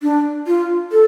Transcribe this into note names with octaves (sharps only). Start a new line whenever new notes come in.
D4
F4
A4